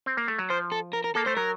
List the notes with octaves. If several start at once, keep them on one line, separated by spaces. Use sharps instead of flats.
C4
A#3
A3
F#3
F3 C5
A4
A#4
A#4
A#3 A4
A3 C5
F#3 A#4